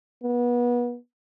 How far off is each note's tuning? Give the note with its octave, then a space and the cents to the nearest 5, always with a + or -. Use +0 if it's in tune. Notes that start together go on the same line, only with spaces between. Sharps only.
B3 -30